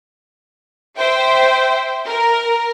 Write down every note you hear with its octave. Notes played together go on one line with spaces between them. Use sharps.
C5 E5 G5
A#4